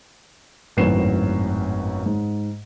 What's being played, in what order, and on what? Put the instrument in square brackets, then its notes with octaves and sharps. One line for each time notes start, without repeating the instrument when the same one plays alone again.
[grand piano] G#1 F#2 A2 B4 C7 E7
G#2